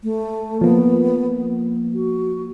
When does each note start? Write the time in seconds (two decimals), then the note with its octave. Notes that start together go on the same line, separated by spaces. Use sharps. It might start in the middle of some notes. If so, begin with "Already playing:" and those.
0.03 A3
0.61 F3 A#3 B3
1.94 F#4